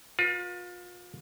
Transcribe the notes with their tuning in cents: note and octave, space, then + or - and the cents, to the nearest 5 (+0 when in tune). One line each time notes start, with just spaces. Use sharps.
F4 +35 B4 -45